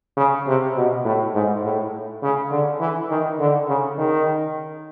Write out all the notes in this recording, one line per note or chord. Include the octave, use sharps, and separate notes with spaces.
C#3
C3
B2
A2
G#2
A2
C#3
D3
E3
D#3
D3
C#3
D#3